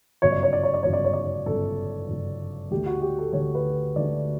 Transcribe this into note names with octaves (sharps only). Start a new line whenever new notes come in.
G1 F#2 C#3 C#5
D5
C#5
D5
C#5
D5
G1 F#2 C#3 C#5
D5
C#5
D5
C#5
G1 F#2 C#3 A4
G1 F#2 C#3
D2 D3 A3 G4
F#4
G4
A4
D2 D3 A3 C#5
B4
D2 D3 A3 D5